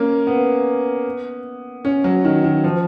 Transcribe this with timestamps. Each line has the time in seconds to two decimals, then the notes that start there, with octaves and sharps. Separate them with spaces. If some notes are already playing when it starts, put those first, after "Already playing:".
Already playing: A#3 C#4
0.27 B3
1.85 C#4
2.04 F#3
2.25 D#3
2.44 D#3
2.64 F3